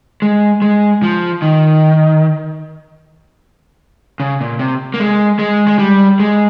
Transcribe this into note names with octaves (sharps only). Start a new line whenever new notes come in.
G#3
G#3
F3
D#3
C#3
A#2
C3
A#3
G#3
G#3
G#3
G3
G#3